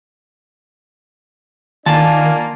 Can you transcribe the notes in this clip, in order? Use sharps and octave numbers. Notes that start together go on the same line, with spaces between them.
D#3 A#3 D4 F4 G#5 A5